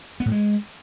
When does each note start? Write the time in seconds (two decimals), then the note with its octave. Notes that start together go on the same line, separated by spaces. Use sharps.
0.20 B3
0.26 A2
0.32 G#3